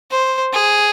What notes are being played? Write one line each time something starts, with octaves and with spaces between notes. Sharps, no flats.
C5
G#4